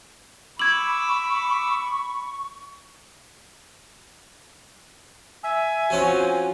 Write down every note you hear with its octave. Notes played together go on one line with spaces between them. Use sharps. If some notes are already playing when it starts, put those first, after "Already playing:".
B5 C#6 D6 E6 G#6 F#7
E5 G#5
F3 C4 C#4 F4 F#4 C#5